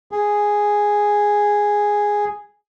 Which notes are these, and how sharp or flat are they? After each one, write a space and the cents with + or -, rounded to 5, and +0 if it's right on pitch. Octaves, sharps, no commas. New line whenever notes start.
G#4 -5